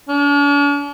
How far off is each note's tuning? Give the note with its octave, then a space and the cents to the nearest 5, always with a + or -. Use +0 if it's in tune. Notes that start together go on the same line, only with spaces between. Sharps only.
D4 -45